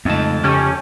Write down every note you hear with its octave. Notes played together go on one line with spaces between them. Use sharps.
F2 C#3 G#3 A3 C4 D#4 A5
C#3 C#4 G4 A4